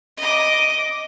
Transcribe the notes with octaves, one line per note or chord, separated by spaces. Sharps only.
D#5 D6